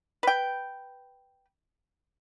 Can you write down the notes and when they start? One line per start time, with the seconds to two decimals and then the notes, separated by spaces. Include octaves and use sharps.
0.23 B4 G5